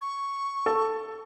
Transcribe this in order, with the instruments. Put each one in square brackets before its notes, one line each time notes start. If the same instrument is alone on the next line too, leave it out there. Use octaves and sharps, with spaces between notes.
[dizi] C#6
[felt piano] A4